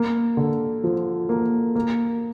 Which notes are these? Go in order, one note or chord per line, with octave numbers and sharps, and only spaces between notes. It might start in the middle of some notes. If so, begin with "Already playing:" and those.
Already playing: A#3
D3
F3
A#3
A#3